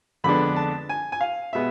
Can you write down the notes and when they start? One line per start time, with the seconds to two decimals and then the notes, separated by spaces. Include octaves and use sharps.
0.24 F2 D3 G#3 B3 D4 B5
0.56 A5
0.89 G#5
1.12 G#5
1.21 F5
1.53 B2 G#3 B3 E5